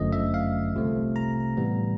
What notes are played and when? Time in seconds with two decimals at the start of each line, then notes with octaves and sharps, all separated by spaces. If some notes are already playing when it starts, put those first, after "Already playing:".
Already playing: G1 F#2 D3 F3 A3 D#5
0.12 E5
0.34 F5
0.74 C2 C3 F3 A3
1.16 A#5
1.57 A2 E3 G3 B3